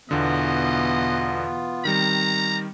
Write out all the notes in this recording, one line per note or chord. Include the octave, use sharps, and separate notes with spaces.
E2 B2 D3 E3 B3 F4 D#5
D#3 G3 C4 A#5